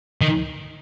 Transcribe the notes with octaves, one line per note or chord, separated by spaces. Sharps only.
D#3